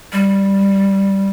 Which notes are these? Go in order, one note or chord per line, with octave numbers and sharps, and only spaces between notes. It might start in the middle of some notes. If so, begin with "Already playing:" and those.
G3